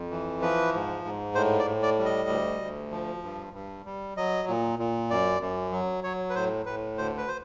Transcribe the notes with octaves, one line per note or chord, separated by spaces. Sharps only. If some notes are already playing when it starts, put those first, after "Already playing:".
Already playing: F2
E3
F3 B4
G#2
G#2
A2 C5
D5
A2
D5
G3
D#5
D2
D2
F3
G2
G2
G3
F#3 D#5
A#2
A#2
F#2 D5
F#2
F#3
F#3 C#5
B4
A2 C5
A2 B4
D2 C5
B4
C5